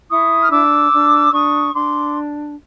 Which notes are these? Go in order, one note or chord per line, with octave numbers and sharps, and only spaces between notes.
E4 C#6 D#6
F6
D4 D6 E6
D4
D4 C#6 D#6
D4 C6 D6